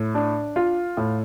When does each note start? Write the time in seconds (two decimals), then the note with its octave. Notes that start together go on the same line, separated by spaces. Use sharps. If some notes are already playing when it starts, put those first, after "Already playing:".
Already playing: A2
0.14 D4
0.56 F4
0.97 A2